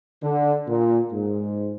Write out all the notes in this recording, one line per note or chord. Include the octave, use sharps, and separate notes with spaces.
D3
A#2
G#2